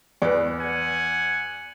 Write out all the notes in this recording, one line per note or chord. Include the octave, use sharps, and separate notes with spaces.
E2 B4 D5
F#5 G#5